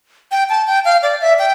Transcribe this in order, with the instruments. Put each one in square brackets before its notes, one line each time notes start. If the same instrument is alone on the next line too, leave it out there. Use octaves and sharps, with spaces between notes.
[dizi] G5
A5
G5
F5
D5
E5
G5